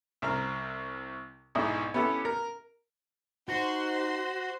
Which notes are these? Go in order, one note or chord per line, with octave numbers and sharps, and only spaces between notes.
C2 C4 A#5 F6
B1 G#2 D4 E4 D#5
B3 C#4 E4 G4 A4
A#4
D#4 F#4 C5 C6